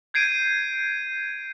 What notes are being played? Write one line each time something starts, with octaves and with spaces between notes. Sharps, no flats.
G6 G#6 C7 D7 D#7